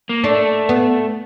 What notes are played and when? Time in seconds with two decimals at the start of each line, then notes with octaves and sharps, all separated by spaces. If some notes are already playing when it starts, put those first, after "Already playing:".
0.09 A#3
0.24 A3 D4
0.69 B3